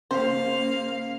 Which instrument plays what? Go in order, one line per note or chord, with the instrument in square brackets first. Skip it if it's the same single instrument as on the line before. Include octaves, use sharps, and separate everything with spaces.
[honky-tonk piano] C#3 [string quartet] A#3 F5 [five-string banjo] C5